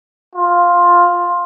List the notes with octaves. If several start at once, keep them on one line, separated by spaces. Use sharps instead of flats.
F4